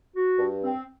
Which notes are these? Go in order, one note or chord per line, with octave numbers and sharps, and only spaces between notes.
F#4
G2
C4